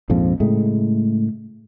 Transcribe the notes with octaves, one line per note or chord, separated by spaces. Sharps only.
A#1 F2 G#2 F3
A2 C#3 G#3 A3